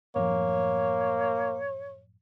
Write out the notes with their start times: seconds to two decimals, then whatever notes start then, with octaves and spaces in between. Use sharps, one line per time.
0.16 F#2 A2 F3 A#3 C#5